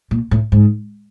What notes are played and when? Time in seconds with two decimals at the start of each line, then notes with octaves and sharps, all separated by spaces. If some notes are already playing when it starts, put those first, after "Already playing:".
0.11 A#2
0.31 A2
0.52 G#2